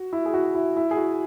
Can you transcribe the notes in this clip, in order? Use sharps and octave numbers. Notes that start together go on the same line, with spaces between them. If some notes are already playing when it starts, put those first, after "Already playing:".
Already playing: F#4
E4
G#4
F#4
E4
E4
G#4
F#4